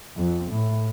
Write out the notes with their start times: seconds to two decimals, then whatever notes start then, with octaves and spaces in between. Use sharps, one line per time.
0.16 F2
0.51 A2